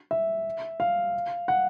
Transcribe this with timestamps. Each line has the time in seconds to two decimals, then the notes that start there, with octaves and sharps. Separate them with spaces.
0.11 E5
0.80 F5
1.48 F#5